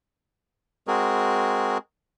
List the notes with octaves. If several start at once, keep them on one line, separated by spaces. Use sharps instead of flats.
G#3 C4 F#4 G#4 A#4